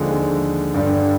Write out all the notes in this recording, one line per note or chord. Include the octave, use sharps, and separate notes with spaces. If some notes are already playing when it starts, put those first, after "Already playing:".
Already playing: D#2 D3 F3 G#3
G2 D3 G3